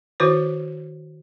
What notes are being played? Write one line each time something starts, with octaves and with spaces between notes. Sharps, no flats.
D#3 E4 F#4 B4 C5